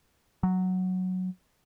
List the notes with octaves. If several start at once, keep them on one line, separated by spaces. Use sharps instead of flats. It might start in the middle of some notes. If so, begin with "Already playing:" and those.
F#3